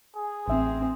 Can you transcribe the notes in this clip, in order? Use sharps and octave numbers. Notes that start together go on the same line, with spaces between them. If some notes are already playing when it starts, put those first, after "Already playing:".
G#4
A1 C4 E5